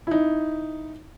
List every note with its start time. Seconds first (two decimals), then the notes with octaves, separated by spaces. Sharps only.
0.07 D#4 E4